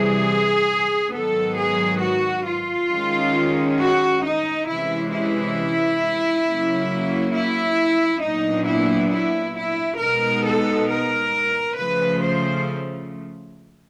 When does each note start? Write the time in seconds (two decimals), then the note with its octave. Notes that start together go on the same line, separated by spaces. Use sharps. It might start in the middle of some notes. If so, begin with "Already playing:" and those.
Already playing: C3 E3 G3 G#4
1.11 G#2 D#3 F#3 B3 A4
1.56 G#4
2.00 F#4
2.45 F4
2.89 D#3 G#3 C#4
3.78 F#4
4.22 D#4
4.66 C3 E3 G#3 C#4 E4
5.11 E4
6.44 C#3 F#3 A#3
7.33 E4
8.21 A#2 F#3 B3 D4 D#4
8.66 E4
9.11 E4
9.55 E4
9.99 B2 G#3 B3 D#4 A#4
10.43 A4
10.88 A#4
11.76 C#3 F3 A3 B4
12.21 C5